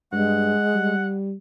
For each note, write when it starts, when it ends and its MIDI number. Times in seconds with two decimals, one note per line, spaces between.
0.13 0.54 43
0.13 0.95 56
0.13 1.13 78
0.75 1.34 55